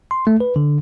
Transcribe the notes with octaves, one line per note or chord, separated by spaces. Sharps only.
C6
A3
B4
D3